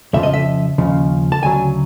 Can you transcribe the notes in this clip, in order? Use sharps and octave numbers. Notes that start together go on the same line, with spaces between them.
F2 C#3 F3 E5
D#5
E5
D#2 C#3 F3
A5
D2 C#3 F#3 G#5